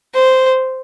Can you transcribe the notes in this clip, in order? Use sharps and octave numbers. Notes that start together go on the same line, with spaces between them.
C5